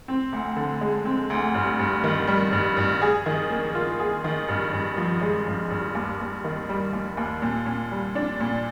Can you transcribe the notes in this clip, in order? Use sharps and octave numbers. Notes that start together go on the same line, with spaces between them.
C4
D2
D3
G#3
C4
D2
G2
G2
D#3
G3
G2
G2
G#4
D#3
A#3
F4
G#4
D#3
G2
G2
F3
G#3
G2
G2
D#2
D#2
D#3
G3
D#2
D#2
A#2
A#2
G3
D4
A#2